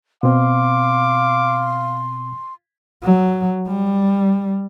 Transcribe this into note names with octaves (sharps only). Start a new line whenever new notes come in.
B2 C4 F5 C6 D6
F#3
G3